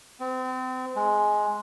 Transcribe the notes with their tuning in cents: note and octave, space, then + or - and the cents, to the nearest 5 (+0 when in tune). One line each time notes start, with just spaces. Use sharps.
C4 -35
G#3 +10